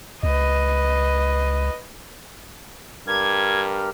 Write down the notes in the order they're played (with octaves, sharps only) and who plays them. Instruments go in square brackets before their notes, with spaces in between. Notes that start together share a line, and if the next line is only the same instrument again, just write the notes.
[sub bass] C#2 [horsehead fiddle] B4 D#5
[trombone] G2 [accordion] G4 A#4 F6 [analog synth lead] G#6